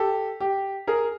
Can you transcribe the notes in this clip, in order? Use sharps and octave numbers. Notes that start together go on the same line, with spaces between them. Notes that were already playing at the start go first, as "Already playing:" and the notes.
Already playing: G4 A4
G4
G#4 A#4